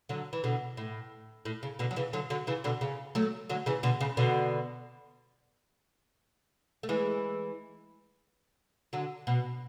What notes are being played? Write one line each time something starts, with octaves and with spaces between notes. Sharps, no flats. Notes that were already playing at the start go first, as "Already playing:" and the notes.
D3 F#3
E3
B2 D3
A2
A2
C#3
B2 D3
F#3
C#3 E3
D3 F#3
D3 F#3
C#3 E3
B2 D3
C#3
F#3 A3
D3 F#3
C#3 E3
B2 D3
C#3
B2 D3
A3
E3 G#3
D3 F#3
B2